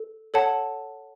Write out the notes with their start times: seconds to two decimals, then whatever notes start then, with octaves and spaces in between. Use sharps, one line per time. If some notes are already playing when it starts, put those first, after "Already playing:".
Already playing: A4
0.34 A4 C#5 F#5 A5